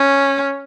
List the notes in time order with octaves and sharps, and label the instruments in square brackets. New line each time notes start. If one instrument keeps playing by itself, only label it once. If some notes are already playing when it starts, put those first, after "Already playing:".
Already playing: [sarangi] C#4